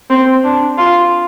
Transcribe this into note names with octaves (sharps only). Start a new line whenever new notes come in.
C4
D4
F4